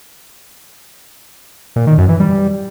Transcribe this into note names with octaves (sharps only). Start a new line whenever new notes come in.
A#2
D#3
F#2
E3
G3